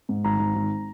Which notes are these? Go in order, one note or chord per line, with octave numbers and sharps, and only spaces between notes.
G#2
G#1 A#5
G#1
G#1